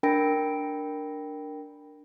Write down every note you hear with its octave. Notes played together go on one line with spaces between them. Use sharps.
D4 A#4 G5 B5 A#6 D7